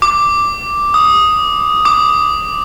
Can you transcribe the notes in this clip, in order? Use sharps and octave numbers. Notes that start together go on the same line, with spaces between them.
D6
D#6
D6